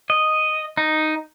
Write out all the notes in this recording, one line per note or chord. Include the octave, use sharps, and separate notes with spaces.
D#5
D#4